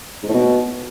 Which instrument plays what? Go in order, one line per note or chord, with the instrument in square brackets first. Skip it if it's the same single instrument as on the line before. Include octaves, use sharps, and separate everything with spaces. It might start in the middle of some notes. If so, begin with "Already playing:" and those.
[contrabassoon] G#2
A2
B2